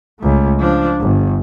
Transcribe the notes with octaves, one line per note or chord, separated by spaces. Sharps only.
C#2 A3
F3 D4
G1